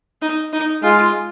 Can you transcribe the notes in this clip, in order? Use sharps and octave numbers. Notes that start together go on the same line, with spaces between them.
D#4
D#4
G#3 F4